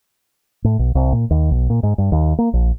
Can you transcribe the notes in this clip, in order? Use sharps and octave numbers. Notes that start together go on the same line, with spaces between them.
A2
B1
C2
A#2
D#2
B1
A#2
G#2
G2
D#2
A#3
A#1